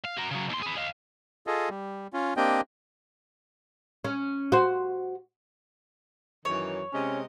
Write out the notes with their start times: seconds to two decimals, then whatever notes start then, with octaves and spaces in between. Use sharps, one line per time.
0.05 F5
0.18 F#4 A#4
0.31 C#3 F#3
0.50 D#2 C6
0.62 G#4 B4
0.76 D#5 F5
1.47 F4 G#4 A4 D#5
1.69 G3
2.13 C#4 F4
2.37 A#3 C4 D4 G4 D#5 G5
4.05 C#4
4.52 F#4 C5
6.45 F#2 D#3 E3 C#5
6.93 C3 G#3 C#4 D#5